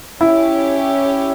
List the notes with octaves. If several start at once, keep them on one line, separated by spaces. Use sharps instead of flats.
C#4 E4 G4 C#5